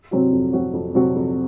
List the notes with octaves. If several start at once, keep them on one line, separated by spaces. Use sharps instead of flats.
C3 F#3 C4 F#4
F2
C3 F#3 C4 F#4
F2
C3 F#3 C4 F#4
F2